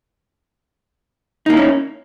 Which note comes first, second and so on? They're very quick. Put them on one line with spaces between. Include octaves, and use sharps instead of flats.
D#4 A#3 E4 C#4